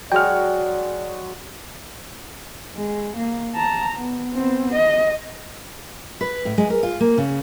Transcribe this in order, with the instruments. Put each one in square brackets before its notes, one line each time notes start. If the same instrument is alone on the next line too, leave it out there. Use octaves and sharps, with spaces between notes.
[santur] F#3 G#3 F#5 [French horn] D5 [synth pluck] G5 F6
[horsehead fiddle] G#3
A#3
A5 A#5
B3
B3 C4
D#5
[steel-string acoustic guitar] B4
A2
G#3
A#4
F4
A#3
C#3